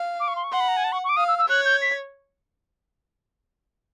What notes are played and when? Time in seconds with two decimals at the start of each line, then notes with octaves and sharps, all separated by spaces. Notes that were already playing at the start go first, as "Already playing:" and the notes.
Already playing: F5
0.20 D6
0.28 C#6
0.36 C6
0.44 C#6
0.52 F#5 C6
0.60 B5
0.68 A#5
0.77 G#5
0.84 A5
0.92 C#6
1.04 C#6
1.09 D6
1.16 F5 D#6
1.28 E6
1.38 E6
1.49 C#5 F#6
1.65 G6
1.82 B6